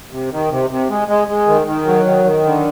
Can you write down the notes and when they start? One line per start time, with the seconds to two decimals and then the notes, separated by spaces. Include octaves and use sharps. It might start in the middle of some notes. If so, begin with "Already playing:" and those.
0.12 C3
0.31 D#3
0.50 C3
0.70 C3
0.90 G#3
1.08 G#3
1.28 G#3
1.47 D#3
1.67 D#3
1.86 F#3
2.05 D#3
2.25 D#3
2.45 D3